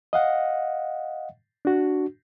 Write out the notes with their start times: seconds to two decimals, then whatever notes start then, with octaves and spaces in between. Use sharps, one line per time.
0.13 D#5 F5 F#5
1.65 D4 F#4